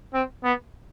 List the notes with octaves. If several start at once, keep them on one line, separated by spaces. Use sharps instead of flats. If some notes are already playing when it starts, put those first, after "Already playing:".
C4
B3